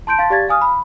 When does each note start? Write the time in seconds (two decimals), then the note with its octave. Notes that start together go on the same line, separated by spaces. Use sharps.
0.07 A5 C6 G6 D7
0.19 F5 A5 C6 A6
0.30 G4 D5 F5 G#6 A6
0.49 F5 G#5 D#6 F6
0.61 B5